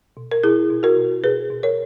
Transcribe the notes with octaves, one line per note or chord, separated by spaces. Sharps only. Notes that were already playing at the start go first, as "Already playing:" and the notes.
B2
A#4
B2 E4 G#4
B2
F#4 A#4
B2
B2 G#4 B4
B2
A#4 C#5